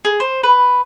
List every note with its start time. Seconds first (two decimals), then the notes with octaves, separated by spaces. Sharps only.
0.05 G#4
0.20 C5
0.43 B4